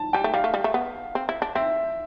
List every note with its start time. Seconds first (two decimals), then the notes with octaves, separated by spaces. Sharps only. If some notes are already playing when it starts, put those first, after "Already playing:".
Already playing: A5
0.13 G3 G5
0.24 A3
0.34 G3 F5
0.44 A3
0.54 G3
0.64 A3
0.74 B3
1.15 C4
1.29 E4
1.42 D4
1.55 C4 E5